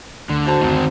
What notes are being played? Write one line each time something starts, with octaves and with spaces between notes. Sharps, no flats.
D2 D3
F#4 C5 A5
F#1 D2 D#3 C4 D#4